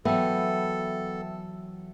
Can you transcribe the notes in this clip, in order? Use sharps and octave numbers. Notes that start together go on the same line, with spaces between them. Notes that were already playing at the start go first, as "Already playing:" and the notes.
E3 F#3 B3 A4 E5 G5